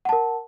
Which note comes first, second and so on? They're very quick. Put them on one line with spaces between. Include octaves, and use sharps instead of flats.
F#5 A5 A#4